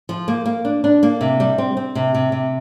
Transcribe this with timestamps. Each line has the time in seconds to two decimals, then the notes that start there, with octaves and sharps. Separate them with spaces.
0.09 F3
0.28 A#3
0.46 A#3
0.65 D4
0.84 D4
1.03 A#3
1.21 C3
1.40 G3
1.58 C4
1.77 C4
1.95 C3
2.15 C3
2.32 C3